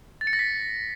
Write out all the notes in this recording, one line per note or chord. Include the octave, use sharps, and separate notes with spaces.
A6
C#7
A#6
B6